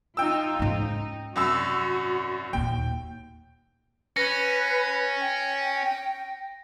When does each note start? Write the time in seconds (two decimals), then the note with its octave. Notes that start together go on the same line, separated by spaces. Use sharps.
0.17 D#4 F4 G5 E6
0.59 G#2 C#4 D#4
1.36 C2 F#2 F#4 E6
2.53 D#2 A#2 G5
4.17 C#4 B4 A#6
5.21 G5